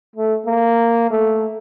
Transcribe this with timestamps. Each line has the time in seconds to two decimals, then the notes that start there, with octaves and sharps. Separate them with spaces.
0.16 A3
0.46 A#3
1.11 A3